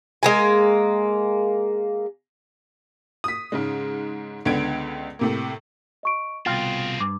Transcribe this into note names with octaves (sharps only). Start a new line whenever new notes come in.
G#3 A#3 G#5
D#6 B6
G#2 C#3 G#3
C#2 D3 B3 G#6 D7
A2 C3 A#3
D#5 C#6 D7
C2 B2 C4 F4 G#4 G5 F6 A6
G2 D6